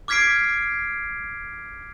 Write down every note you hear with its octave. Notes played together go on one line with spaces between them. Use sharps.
D6 F6 G#6 B6 C7 D7